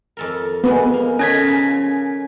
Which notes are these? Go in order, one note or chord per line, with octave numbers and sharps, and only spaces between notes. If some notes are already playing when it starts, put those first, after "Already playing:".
F2 A4 A#4
F2 A#2 G#3 B3
A#3
D#3 A3 A#3 C#4 G#6 B6
C#3 F3